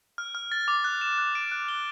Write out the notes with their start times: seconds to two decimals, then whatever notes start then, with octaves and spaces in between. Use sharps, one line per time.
0.18 F6
0.35 F6
0.52 A6
0.68 D6
0.84 F#6
1.01 E7
1.18 F#6
1.35 D7
1.52 F#6
1.69 G7